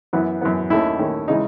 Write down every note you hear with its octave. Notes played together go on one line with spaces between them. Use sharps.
F#2 E3 B3
F#2 E3 B3
D#2 D#3 A3 C#4 E4
D#2 D#3 A3 C#4
C#3 E3 G#3 D#4